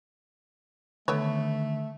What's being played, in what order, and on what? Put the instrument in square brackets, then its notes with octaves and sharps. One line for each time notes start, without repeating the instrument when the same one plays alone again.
[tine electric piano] D3 D#3 [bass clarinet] A3 [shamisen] B3 A4 C#5